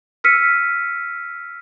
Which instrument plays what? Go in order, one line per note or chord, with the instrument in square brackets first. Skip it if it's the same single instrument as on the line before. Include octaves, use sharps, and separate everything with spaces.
[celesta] E6 F6 B6 C#7 D#7